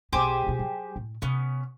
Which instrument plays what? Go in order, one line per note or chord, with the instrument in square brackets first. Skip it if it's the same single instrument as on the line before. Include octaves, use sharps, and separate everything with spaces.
[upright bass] B1 B3 [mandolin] G4 G#4 C5
[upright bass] B2 F4
F#3
A2
[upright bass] C3 [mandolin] B3 C#4